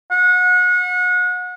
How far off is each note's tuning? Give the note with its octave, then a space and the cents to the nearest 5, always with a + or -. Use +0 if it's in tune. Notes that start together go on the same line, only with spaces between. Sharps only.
F#5 -30